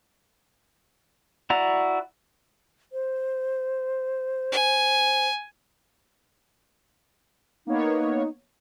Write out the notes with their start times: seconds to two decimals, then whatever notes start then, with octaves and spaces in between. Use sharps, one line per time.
1.50 E4 F#4 D5 F#5 A#5
2.93 C5
4.52 G#5
7.67 A#3 B3 D#4 C#5